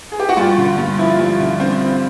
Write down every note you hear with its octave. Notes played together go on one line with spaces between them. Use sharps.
G#4
G4
F#4
G2 F4
D3
G2
F3 E4
F4
G2 E4
D3
G2 C4
F3